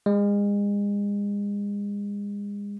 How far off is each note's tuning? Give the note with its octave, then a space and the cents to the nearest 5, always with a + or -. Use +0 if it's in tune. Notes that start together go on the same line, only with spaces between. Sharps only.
G#3 -35